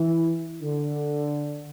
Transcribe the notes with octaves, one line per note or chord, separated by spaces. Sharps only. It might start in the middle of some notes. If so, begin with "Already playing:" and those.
Already playing: E3
D3